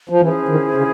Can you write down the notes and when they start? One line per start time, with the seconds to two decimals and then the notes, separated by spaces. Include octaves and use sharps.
0.09 F3
0.21 E3 C#4 E4 G#4 C5
0.48 D#3
0.75 C#3